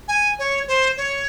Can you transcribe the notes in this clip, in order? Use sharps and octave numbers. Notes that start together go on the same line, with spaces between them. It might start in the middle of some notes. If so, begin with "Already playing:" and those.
G#5
C#5
C5
C#5